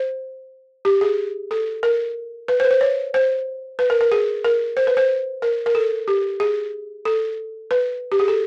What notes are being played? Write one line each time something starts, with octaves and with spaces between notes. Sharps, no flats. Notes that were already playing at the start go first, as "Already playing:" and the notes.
Already playing: C5
G4
G#4
A4
A#4
B4
C5
B4
C5
C#5
C5
B4
A#4
A#4
G#4
A#4
C5
B4
C5
A#4
A#4
A4
G4
G#4
A4
B4
G4
G#4
A4